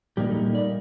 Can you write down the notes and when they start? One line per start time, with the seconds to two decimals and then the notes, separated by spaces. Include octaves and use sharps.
0.17 A#2 G3 A#3 D#4 G4
0.30 A4
0.55 D5